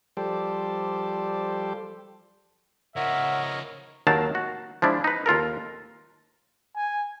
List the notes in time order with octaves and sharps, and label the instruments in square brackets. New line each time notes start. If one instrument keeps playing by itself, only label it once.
[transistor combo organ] F3 G3 G4 A4 C5 D5
[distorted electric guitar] C#3 F3 [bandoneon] A#4 C#5 D#5 [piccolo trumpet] E5 [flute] F#5
[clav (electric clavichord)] D#2 D#3 F#3 A#4 F5 A5
F#4
F3 G#3 D4 E4
D#4 B4
D#2 F4 A4 A#4
[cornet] G#5